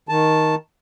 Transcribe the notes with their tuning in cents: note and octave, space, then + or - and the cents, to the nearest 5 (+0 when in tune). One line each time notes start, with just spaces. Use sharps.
D#3 +10 A5 +0